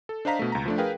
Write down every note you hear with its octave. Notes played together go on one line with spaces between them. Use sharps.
A4
D4 C5 D#5 F5 A#5 B6
B2 A3
C#2 A#5
F3 A3 D4
G#4 A#4 B4 F5 G5